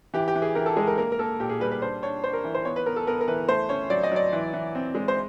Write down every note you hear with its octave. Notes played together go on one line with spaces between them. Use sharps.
E3 G4
G4
E3
G#4
E3 A#4
A4
G#3 G#4
A#4
A#3 A#4
A#4
A#3 A4
A#2 G4
G#4
G3 B4
B4
D4 C5
D4 C#5
D4 C5
A#4
E3
C5
B3 C#5
B4
B3 A#4
A4
B3 A#4
A#4
E3 B4
A3 C5
C#4 C#5
F#3 D5
D#5
F#3 D5
E3
E3
C4
G#3
C5